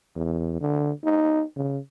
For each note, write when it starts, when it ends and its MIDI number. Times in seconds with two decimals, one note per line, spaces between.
0.16 0.57 40
0.61 0.92 50
1.04 1.44 63
1.56 1.78 49